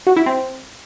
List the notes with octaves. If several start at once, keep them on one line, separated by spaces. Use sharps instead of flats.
F#4
E4
C4